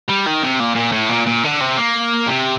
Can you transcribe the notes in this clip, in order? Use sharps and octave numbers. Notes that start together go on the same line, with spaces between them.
G3
D#3
C3
A#2
A#2
A2
A#2
A#2
D3
C3
A#3
C3